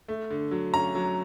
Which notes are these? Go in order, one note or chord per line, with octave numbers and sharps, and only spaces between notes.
A3
D3
F#3
C#4 A#5
F#3